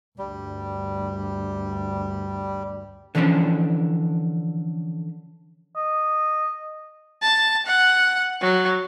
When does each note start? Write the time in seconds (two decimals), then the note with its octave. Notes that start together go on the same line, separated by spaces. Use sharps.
0.18 D2 G2 G3
3.15 D3 E3 F3 G3 C#4 D4
5.77 D#5
7.22 A5
7.67 F#5
8.41 F#3